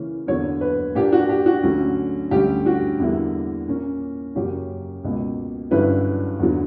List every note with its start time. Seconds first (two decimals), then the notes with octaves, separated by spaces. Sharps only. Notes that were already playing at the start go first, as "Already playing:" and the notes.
Already playing: C#3 E3 A#3 C#4
0.27 E2 D3 F#3 A#3 C#5
0.61 B4
0.95 A#2 A#3 D4 G4
1.12 F#4
1.29 G4
1.46 F#4
1.63 D2 D3 F#3 C#4
2.31 D2 D3 G3 C#4 G4
2.66 F#4
3.00 E2 D3 G3 A#3 E4
3.68 A#2 A#3 C#4
4.35 F#2 C#3 F#3 A#3 C#4 G4
5.04 C#2 B2 A#3
5.71 G2 D3 F#3 C#4 E4 B4
6.39 E2 D3 F#3